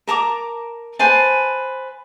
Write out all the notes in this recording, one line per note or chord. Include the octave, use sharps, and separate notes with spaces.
A#4 A5 A#5 D6
B4 C5 G#5 A5